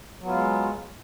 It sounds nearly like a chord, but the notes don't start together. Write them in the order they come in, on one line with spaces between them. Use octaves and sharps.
F#3 B3 F4 G#3